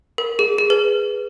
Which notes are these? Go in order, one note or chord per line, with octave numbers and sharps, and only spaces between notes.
A#4
G#4
G#4
B4